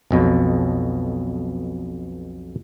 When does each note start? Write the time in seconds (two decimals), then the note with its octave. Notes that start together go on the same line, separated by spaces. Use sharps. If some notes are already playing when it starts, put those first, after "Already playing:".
0.11 B1 F2 B2